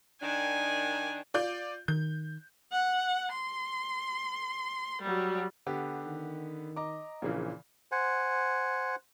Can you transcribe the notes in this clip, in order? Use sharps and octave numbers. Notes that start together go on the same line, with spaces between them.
D#3 D4 G#5
F4 D5 G6
D#3 G6
F#5
C6
F#3 G3
D3 B3 G4
D#3
D#5 A#5 D6
A#1 A#2 C#3 E3
C5 F#5 G#5